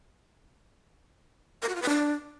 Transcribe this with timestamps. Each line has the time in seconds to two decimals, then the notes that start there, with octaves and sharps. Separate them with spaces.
1.62 A#4
1.69 F#4
1.75 F4
1.82 B4
1.89 D4